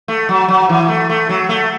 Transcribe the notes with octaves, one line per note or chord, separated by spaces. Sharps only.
A3
F#3
F#3
E3
A3
A3
F#3
A3